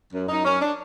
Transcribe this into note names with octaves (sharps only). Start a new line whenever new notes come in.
F#2
F#2 D#4
F#2 C#4
D4